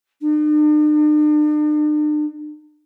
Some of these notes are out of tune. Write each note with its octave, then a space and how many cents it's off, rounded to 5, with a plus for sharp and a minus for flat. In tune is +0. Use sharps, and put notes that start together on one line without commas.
D4 +45